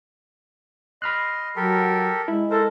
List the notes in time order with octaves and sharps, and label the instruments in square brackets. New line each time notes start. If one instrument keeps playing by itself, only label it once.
[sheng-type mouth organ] D#5 C6 [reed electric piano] B5 F6 F#6
[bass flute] F#3 [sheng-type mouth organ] G4 A4 A#4
[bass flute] G#3 [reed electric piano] E4
[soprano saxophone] A4 [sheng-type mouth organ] A#4 C5